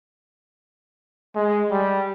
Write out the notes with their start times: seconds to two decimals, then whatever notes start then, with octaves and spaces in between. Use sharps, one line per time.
1.36 G#3
1.71 G3